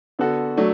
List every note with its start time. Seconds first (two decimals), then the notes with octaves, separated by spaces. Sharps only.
0.19 D3 B3 F#4 A4
0.57 F#3 A3 D4